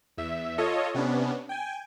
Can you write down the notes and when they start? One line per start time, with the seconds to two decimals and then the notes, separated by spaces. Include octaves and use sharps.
0.17 E2 E5
0.58 F4 A4 C#5 D#5
0.94 C3 B3 C#4 D4
1.49 G5 G#5